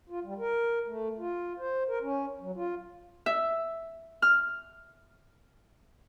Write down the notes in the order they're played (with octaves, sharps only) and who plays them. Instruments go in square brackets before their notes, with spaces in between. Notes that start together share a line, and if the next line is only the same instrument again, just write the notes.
[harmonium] F4
G3
A#4
A3
F4
C5
A#4
C#4
F#3
F4
[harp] E5
F6